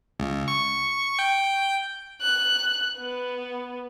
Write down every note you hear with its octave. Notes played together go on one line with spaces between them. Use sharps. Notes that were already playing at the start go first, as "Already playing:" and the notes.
C#2
C#6
G5
F#6
B3